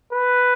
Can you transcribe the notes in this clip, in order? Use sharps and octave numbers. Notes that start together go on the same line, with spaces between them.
B4